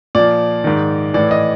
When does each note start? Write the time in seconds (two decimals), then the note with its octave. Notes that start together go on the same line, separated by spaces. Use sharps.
0.15 A#2 F3 D5
0.64 G#2 D#3
1.14 A2 E3 D5
1.31 D#5